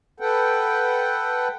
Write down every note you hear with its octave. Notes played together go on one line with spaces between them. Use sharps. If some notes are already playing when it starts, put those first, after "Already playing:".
A4 B4 F#5 G5